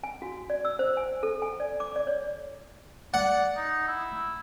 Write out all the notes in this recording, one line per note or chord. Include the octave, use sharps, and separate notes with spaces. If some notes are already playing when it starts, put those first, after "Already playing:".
G#5
F#4
D5
E6
C5
G#5
A4
G#5
D5
D6
D5
C#5
D5 F#5
D#4
E4